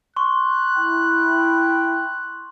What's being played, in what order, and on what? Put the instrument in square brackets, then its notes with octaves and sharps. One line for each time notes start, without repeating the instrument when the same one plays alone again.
[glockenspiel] C6 C#6 [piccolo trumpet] F#6
[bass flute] E4 [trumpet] G5